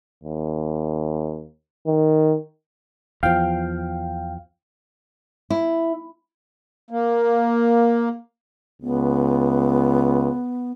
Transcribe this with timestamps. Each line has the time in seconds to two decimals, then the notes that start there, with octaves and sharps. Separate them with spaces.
0.24 D#2
1.87 D#3
3.23 E2 F3 F5 G5
5.50 E4
6.91 A#3
8.82 C#2 B3